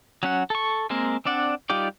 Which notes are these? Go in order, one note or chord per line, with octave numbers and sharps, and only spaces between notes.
F#3 C#4 F#5
A4 C#6
G#3 A#3 C4 A#4
C4 D4 D5 F#5
G3 D#4 F4 G4 D5